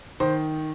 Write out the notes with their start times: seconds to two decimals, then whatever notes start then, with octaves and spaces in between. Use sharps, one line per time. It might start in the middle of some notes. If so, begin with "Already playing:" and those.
0.20 D#3 C5